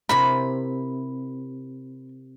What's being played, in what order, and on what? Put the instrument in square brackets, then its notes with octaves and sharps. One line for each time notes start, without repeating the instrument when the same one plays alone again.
[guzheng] C3 E4 A#4 [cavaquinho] B5